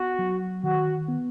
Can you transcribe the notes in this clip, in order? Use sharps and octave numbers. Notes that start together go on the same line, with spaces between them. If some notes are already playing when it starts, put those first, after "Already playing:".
Already playing: B3 F#4
F#3
D#3 F#4
B3